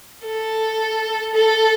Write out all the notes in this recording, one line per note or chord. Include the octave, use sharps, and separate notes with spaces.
A4
A4